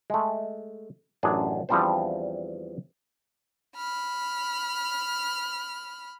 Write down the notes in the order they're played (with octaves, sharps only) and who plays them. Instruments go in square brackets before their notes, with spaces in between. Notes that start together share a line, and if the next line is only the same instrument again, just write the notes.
[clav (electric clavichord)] G#3 A3
A1 F#2 D4 G#4
E2 F3 G3 C4 D4 C5
[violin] B5 F6